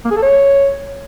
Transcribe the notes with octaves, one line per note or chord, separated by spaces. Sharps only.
A#3
G#4
A4
C#5